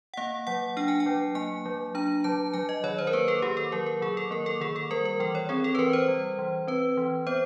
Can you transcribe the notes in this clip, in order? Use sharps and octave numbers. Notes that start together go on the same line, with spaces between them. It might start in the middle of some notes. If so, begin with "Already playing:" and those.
F#5
A#3 F5
F#3 F#5
D4 G5
G#5
G5
F#3
A#3 G#5
F#3
D4 A#5
F#3 A5
F#3 G#5
D#5
D#3 C#5
C5
A#4
A#3 B4
A4
D#3 G4
A4
F#3 A#4
A#4
D#3 G#4
A4
A#3 A#4
A4
D#3 G#4
A4
G3 A#4
A#4
E3 A4
C#5
C4 G#4
A4
B4
E3 A#4
C5
G3
E3
C4 B4
E3
B3 C5